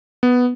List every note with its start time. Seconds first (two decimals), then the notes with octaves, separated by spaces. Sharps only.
0.23 B3